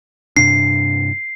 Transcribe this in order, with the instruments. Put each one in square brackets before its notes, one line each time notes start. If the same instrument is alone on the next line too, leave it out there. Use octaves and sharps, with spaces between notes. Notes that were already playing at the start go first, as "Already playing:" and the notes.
[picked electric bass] G2 C3 D4 [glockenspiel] C7